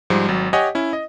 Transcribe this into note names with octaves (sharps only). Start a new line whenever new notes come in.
G#2 F3 G3
G#1 F#3
G4 C#5 D#5 F#5 G#5
C#4 E4
D#5